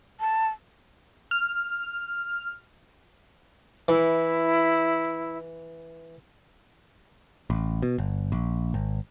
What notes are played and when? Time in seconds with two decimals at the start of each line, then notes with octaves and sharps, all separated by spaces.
0.20 A5
1.31 F6
3.88 E3 E4
7.50 A1
7.82 B2
7.98 G1
8.32 A#1
8.74 G#1